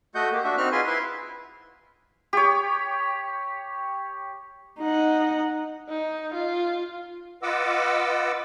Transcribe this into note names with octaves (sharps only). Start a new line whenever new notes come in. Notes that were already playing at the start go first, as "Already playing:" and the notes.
A3 F#4 D#5 F#5 G6
A#3 G4
D4 F#4 E5
C4 D#4 F#4 F6 F#6
F4 G#4 B4 G#5 C6
E4 B4 E5 C6
G4 C#5
D#4 F#5
D#4
F4
F4 B4 D#5 F#5 D6 E6